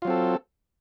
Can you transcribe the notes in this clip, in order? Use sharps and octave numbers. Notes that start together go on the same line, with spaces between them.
F#3 C4 F4 A4